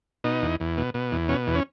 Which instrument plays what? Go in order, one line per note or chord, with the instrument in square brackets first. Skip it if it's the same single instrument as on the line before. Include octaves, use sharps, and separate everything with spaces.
[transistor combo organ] B2 D#4
E2
E2
B2
B2
E2
B2 C#4
E2
C#4